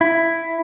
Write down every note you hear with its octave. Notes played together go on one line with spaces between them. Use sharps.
E4